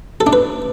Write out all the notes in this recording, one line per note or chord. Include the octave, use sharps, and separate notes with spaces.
A4
D4
B4